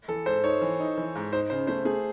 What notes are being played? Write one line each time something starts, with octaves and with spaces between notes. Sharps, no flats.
E3 A4
G#2 C5
D#4 C#5
E3
D#4
E3
G#2
D#4 C5
C#3 C5
A3 C5
A3 G#4